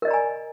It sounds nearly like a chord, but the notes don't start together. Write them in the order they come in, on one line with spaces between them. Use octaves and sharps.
A#4 D#5 D5 A#5 G#5